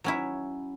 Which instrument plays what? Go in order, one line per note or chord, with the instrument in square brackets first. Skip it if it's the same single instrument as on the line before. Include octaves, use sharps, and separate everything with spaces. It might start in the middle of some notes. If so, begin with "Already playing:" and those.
[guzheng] F#3 C#4 E4